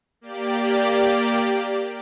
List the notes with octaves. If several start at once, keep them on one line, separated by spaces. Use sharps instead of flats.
A#3 G4 D5